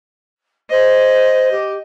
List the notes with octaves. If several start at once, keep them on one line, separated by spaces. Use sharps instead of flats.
C5 D#5
G4